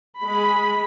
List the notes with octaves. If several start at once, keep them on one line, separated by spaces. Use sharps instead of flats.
G#3 B5